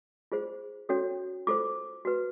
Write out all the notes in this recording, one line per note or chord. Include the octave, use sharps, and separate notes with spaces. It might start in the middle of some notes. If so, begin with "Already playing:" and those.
F4 G#4 C5
C#4 F#4 A4 C#5
F4 A4 C5 D6
F#4 B4